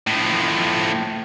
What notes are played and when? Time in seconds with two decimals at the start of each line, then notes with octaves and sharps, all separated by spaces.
0.07 A2 F3